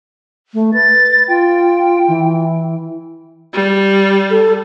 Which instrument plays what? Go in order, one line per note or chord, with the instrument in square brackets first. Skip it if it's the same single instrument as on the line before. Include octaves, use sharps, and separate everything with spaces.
[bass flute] A3
[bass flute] B4 [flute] A6
[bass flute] F4 [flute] G5
[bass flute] E3
[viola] G3
[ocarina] A4